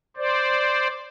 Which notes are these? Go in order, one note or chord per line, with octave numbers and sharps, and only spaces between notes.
C5 D5